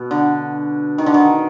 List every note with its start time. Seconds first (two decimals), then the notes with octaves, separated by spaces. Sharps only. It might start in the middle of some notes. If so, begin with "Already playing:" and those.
Already playing: B2
0.11 D3
0.98 D#3
1.06 D3
1.14 D#3